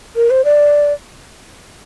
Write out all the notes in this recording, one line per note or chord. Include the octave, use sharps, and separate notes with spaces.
A#4
C5
D5